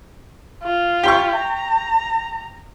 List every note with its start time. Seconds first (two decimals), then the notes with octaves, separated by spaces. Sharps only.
0.63 F4
1.03 G4 C6 C#6
1.37 A#5